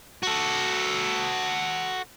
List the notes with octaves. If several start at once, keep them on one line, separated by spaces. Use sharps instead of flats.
F#4 A4